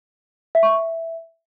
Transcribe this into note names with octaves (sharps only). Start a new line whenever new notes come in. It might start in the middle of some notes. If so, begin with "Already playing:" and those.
E5
C#6
E5